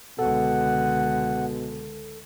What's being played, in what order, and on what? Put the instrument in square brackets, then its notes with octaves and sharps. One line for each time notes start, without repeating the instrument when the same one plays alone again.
[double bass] C#2 D3 [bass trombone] B2 [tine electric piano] A4 [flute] F#5